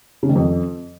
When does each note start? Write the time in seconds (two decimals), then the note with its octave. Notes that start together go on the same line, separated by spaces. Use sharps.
0.23 C#3
0.29 D#3
0.35 F2